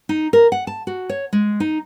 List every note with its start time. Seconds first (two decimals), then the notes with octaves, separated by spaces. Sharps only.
0.09 D#4
0.33 A#4
0.52 F#5
0.67 A5
0.87 F#4
1.09 C#5
1.33 G#3
1.60 D#4